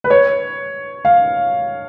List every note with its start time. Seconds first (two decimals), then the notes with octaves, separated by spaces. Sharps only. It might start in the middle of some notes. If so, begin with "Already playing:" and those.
0.04 B4
0.10 C#5
1.05 F5